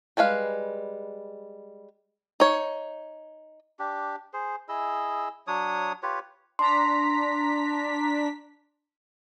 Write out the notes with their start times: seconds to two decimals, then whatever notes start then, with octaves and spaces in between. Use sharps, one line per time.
0.17 G3 G#3 B4 F5
2.40 D#4 C#5
3.79 D4 G4
4.33 G#4 C5
4.69 E4 G#4 D#5 E6
5.47 F#3 D4 C#5 D#6
6.03 F4 G4 B4 C#5
6.59 D4 A#5 C6 B6